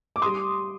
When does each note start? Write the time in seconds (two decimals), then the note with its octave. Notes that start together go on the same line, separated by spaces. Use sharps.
0.16 D6
0.22 G3 C6 D#6